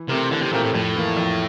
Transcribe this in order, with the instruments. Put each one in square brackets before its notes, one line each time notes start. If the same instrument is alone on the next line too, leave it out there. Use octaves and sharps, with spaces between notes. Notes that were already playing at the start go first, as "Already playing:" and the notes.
Already playing: [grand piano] E3
[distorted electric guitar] C3 [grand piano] A3 C4 G4 A#4
[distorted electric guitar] D3 [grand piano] E3
[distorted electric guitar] C3
[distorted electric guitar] A#2 [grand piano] A3 C4 G4 A#4
[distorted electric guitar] A2
[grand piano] F2 [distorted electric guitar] A2
[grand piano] E3 A#3
F2